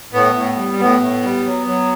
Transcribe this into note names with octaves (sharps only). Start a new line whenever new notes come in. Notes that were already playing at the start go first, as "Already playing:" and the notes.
A2 B3
A2
G3
A2 B3
A2
G3
F#3
F#3